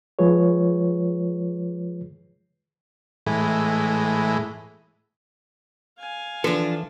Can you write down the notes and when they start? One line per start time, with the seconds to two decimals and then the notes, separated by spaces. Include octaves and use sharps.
0.19 F3 G#3 F4 G#4 B4 C#5
3.27 A2 E3 G#3
5.99 F5 G#5
6.44 E3 F3 D4 A4